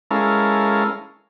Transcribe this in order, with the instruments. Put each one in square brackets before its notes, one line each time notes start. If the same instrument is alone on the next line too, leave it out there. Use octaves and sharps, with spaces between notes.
[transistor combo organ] G#3 C#4 E4 A4 A#4 F5